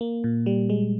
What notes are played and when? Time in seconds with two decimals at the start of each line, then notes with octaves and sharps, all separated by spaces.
0.01 A#3
0.24 A#2
0.46 G3
0.70 G#3